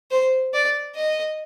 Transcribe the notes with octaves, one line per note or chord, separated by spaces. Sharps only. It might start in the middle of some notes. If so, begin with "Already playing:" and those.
C5
D5
D#5